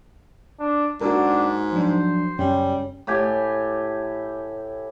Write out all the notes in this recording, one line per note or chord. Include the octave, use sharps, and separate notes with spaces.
D4
G#2 D4 F#4 A#4
F3 F#3 D4 C5
F#2 G3 C#4
A2 G4 G#5